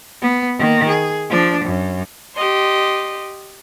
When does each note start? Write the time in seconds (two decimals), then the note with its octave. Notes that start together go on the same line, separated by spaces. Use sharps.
0.22 B3
0.59 D#3 A#3
0.89 G#4
1.30 F3 D4
1.65 F#2
2.35 G4 D#5 C6